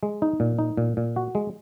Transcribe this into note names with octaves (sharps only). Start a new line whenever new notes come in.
G#3
D#4
A#2
D#4
A#2
A#2
F#4
G#3